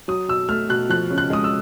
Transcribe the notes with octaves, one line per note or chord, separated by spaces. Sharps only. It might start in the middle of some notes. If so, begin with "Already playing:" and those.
F#3 D#6
B2 E6
A3 F6
B2 F#6
F3 F#6
C#3
F#6
G#3 D#6
E6